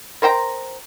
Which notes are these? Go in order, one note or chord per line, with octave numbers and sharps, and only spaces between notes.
A#4 C5 G5 A#5